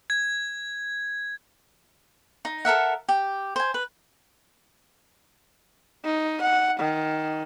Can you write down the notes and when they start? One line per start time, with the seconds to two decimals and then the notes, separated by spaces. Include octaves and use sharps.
0.10 G#6
2.45 D#4
2.65 A4 A#4 E5 F#5
3.09 G4
3.56 C5 G#5
3.74 B4
6.05 D#4
6.41 F#5
6.79 D#3